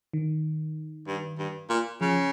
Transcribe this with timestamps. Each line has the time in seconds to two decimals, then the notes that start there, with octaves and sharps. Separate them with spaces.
0.13 D#3
1.07 G2
1.38 G2
1.69 A#2
2.01 C#3 F3